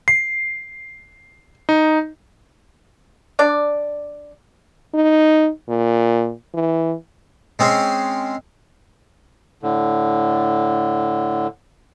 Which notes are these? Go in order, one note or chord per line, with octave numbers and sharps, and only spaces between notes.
C7
D#4
D4 D5
D#4
A#2
E3
G#3 C4 C#4
A2 D3